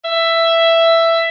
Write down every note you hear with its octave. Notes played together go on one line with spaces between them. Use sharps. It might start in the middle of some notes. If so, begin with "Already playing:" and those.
E5